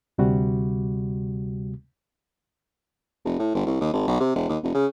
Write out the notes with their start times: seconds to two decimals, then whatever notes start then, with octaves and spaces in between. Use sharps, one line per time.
0.18 D2 C3 G3 F#4
3.25 F1
3.39 A2
3.55 G1
3.66 C2
3.81 D#2
3.93 G#1
4.08 B1
4.20 C3
4.35 E1
4.49 D#2
4.63 F1
4.75 C#3